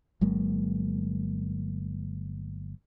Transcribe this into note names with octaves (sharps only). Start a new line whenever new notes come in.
G1 F#3 G#3 A#3